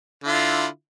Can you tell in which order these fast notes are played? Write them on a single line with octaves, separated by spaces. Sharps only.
D3 F4 E4